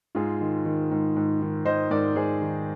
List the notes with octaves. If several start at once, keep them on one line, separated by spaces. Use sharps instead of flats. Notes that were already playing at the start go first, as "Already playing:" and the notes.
G#2 F4 G#4
D#3
D#3
G#2
G#2
D#3
D#3 C5 D#5
G#2 A#4 D5
G#2 G#4 C5
D#3